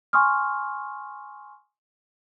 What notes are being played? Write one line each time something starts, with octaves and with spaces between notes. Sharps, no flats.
G#5 C6 C#6 D#6 F6